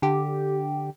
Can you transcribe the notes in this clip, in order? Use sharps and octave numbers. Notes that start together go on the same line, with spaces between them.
D3 G4